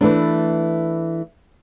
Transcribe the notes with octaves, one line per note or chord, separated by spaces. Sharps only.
E3 A3 D4